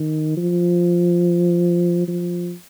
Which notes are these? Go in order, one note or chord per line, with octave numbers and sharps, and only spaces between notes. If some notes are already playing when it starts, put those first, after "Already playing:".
Already playing: D#3
F3
F3